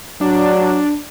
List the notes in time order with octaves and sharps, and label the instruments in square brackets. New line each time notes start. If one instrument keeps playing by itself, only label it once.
[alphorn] F#3 [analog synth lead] D4